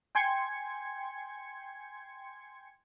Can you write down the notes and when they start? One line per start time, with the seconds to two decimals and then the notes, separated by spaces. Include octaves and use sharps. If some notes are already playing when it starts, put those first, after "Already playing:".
0.15 G5 G#5 C6 G#6 C#7